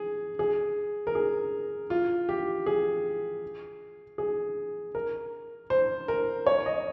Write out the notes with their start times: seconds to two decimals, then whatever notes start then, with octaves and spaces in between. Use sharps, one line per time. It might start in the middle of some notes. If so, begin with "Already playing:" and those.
Already playing: G#4
0.39 G#4
1.07 A#4
1.15 G#4
1.90 F4
2.29 G4
2.66 G#4
4.18 G#4
4.95 A#4
5.70 C5
6.08 A#4
6.47 C#5
6.66 D#5